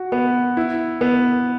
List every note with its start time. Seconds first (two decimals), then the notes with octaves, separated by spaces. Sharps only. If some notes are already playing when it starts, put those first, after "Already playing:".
Already playing: F#4
0.12 B3
0.57 E4
1.01 B3